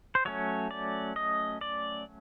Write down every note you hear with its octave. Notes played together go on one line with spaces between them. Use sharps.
C5
F#3 A3 C#4 C#5
D5
D#5
D5